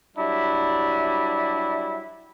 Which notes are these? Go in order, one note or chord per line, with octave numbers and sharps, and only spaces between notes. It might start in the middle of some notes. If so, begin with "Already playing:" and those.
F#3 G3 D4 E4